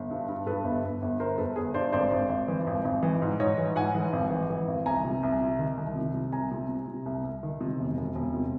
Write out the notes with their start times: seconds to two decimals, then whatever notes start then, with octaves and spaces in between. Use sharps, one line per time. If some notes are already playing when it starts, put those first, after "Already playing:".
Already playing: G1
0.10 G2
0.29 G2
0.46 G2 A4 B4
0.64 G1
0.84 G1
1.02 G1
1.20 G1 A#4 C5
1.38 G1 A4 B4
1.56 G1 G#4
1.74 G2 C5 D5
1.93 G#1 C5 D5
2.11 G#1
2.29 G#1
2.48 E3
2.67 G#1
2.85 G#1
3.03 E3
3.22 G#2
3.40 G#2 C#5 D#5
3.58 E3
3.76 G#2 F#5 G#5
3.95 E3
4.13 G#1
4.31 E3
4.50 E3
4.68 G#1
4.86 C2 G#5 A#5
5.05 C3
5.23 C2
5.41 C3
5.59 D#3
5.78 C2
5.96 C3
6.14 C3
6.32 C2 G#5 A#5
6.51 C3
6.69 C3
6.88 C3
7.06 C2
7.24 C2
7.43 D#3
7.61 C3
7.79 E1
7.97 E1
8.15 E1
8.34 C3